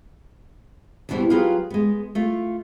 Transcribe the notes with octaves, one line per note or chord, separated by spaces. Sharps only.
E2 B2 D3 E3 G3 C4
F#3 F4 G4 G#4 B4 F5
G#3 B3
A3 F4